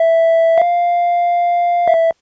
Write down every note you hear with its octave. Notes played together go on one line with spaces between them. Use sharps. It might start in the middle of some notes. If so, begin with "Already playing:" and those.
Already playing: E5
F5
E5